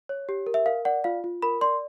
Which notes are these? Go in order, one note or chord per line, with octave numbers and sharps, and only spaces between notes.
C#5
G4
A#4
E5
A#4 F5
D5 F#5
F4 F5
F4
A#4 B5
D5 C6